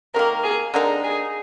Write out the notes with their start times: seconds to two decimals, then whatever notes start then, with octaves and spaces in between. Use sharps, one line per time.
0.14 C3 D#3 A#3 A#4
0.44 G#4
0.74 D3 G#3 C4 D#4 A#4
1.04 G#4